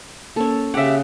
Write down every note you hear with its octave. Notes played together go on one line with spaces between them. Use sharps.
A#3 C#4 A4 C#5
C#3 G4 E5 F#5